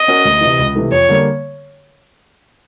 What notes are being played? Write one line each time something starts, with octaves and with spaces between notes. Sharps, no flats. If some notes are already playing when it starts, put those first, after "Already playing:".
Already playing: D#5
C#4 F#4 A#4
D2
C3 E3
C#2
C3 E3 A3
F2 C#5
D3 G3 A#3